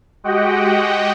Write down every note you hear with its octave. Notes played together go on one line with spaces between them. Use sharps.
G#3 F#4 G4 D#5 F#5 G5